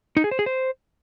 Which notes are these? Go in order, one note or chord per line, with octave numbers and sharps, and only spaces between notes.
D#4
G#4
C5
G#4
C5